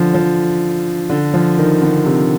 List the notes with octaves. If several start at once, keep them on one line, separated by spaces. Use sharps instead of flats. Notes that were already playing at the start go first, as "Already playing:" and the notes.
Already playing: D3 F3
F3
D3
F3
D#3
D3
C3